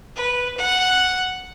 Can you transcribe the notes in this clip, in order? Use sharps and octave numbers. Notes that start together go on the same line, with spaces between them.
B4
F#5